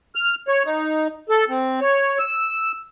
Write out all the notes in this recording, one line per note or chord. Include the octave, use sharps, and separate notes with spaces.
F6
C#5
D#4
A4
C4
C#5
E6